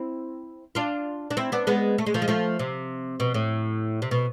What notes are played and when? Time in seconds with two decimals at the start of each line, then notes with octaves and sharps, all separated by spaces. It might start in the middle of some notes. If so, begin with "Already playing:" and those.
Already playing: C4 E4
0.75 D4 F4
1.31 D4
1.37 C4 E4
1.52 B3 D4
1.67 G#3 B3
1.98 A3
2.06 G#3
2.14 F3 A3
2.22 G#3
2.28 F3 A3
2.59 C3
3.20 B2
3.34 A2
4.02 C3
4.11 B2